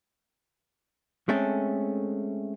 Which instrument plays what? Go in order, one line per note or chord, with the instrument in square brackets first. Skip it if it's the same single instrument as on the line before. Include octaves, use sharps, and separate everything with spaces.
[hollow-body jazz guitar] G#3 A3 C4 C#4 A4